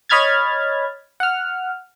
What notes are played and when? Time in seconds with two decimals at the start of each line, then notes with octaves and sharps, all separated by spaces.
0.09 C#5 D#5 B5 F6 G#6 A6
1.20 F#5 F6